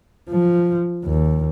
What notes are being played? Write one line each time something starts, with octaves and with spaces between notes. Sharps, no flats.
F3
D#2